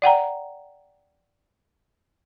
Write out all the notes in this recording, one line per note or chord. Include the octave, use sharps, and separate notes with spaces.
D5 F#5 G5 A#5